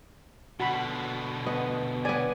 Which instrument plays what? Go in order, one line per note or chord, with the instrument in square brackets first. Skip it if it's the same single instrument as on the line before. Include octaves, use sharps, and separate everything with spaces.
[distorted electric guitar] B2 D3 [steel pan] F#4 B5
[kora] B3 [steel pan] D#5
[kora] B3 D5 [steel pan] G#5